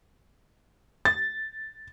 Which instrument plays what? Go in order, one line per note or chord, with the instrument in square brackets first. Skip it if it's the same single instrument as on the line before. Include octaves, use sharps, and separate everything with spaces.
[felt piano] A6